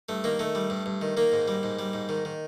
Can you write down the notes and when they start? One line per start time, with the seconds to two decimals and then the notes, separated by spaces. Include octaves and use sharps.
0.09 G2 A3
0.24 D#3 A#3
0.39 D#3 A3
0.55 G3
0.70 G2
0.86 G2
1.02 D#3
1.17 D#3 A#3
1.32 G#2
1.48 G3
1.63 G#2
1.79 G3
1.93 G#2
2.09 D#3
2.25 D#3